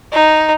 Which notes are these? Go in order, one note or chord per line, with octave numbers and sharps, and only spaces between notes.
D#4